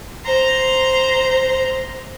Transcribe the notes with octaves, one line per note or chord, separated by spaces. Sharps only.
C5 A#5